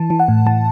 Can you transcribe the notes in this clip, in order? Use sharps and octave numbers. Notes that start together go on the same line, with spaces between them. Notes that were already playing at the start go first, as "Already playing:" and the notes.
Already playing: E3 A5
E3
F#5
A2
E3 A5